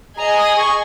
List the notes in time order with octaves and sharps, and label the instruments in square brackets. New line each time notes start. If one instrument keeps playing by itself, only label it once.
[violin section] G#4 D#5 G#5 [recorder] A#5
[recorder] D#6
C#6